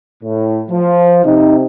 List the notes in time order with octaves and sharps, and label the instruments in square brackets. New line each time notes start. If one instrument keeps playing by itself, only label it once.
[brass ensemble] A2
F3
[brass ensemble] C3 [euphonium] D#4